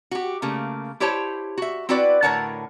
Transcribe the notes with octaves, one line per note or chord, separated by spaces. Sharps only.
F#4 G4
C#3 A3 A#3
E4 G4 C5 C#5 A5
F#4 E5
C4 E4 F#4 B4 D5
A2 D3 A#4 C#5 F#5 A5